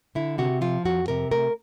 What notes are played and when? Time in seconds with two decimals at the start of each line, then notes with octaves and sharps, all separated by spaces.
0.15 D3 E4
0.38 C3 F#4
0.61 F3 F4
0.85 F2 F#4
1.08 C3 A#4
1.31 A3 A#4